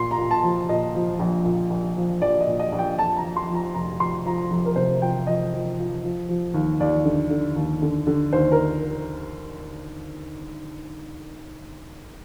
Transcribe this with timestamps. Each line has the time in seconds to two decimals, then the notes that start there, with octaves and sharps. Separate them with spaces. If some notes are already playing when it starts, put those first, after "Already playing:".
Already playing: A#2 C6
0.11 A#5
0.18 A#2
0.31 A5
0.43 F3
0.69 A#2 D#5
0.95 F3
1.19 A#1
1.45 A#2
1.70 A#1
1.97 F3
2.21 A#1 D5
2.41 D#5
2.47 A#2
2.60 D#5
2.72 A#1
2.79 G5
2.99 F2 A5
3.17 A#5
3.23 F2
3.36 C6
3.50 F3
3.55 A#5
3.74 F1 A#5
3.99 F3 C6
4.25 F3 A#5
4.51 F2 A#5
4.65 A#4
4.76 C3 C5
5.01 F3 G5
5.27 F3 D#5
5.53 F3
5.78 F3
6.03 F3
6.29 F3
6.54 D#2
6.80 D#2 D5
7.05 D3
7.30 D3
7.56 D#2
7.82 D3
8.07 D3
8.33 D#2 C5
8.52 A#4